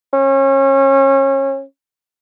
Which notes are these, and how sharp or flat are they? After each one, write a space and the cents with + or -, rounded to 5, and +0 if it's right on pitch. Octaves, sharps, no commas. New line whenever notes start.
C#4 -30